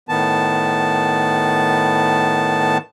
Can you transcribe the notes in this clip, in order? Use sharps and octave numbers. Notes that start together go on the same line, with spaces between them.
A2 D#3 B3 A5